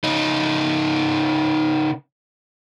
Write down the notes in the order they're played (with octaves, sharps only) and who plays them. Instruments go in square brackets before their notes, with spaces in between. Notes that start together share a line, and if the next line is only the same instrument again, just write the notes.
[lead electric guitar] C#3 D#4